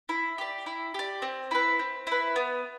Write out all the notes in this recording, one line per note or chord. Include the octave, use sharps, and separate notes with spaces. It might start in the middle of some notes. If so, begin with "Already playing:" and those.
E4
G4 D5
E4
G4 D5
C4
E4 B4
C4
E4 B4
B3